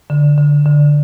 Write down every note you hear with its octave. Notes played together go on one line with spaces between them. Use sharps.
D3
D3
D3